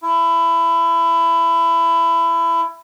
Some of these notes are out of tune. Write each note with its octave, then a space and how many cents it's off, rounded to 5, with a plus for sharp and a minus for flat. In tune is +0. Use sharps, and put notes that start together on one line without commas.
E4 +20